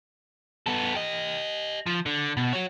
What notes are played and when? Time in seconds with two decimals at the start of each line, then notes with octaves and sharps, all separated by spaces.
0.66 B3 A4
0.95 G4 D#5
1.86 F3
2.06 D3
2.37 B2
2.53 F#4 C#5